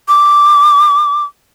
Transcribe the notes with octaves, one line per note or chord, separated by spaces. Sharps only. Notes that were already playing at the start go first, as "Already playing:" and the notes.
D6